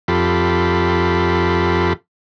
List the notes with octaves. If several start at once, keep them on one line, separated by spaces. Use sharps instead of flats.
F2 F4 G4 A4 B5